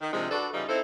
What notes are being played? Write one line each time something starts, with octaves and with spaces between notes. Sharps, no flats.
D#3
C3 D#3 F3 G#3 D4
D4 F#4 A4 B4 D5
C#3 E3 G3 D#4 F4
C4 D#4 E4 A4 C5